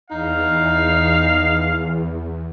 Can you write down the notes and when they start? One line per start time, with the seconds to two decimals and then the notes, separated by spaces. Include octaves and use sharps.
0.11 E2 D#4 F5